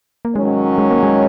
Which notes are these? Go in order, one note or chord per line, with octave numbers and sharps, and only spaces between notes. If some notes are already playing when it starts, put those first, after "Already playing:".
A#3
G#2 D#3 F#3 G#3 C#4
G#3
A#3
G#3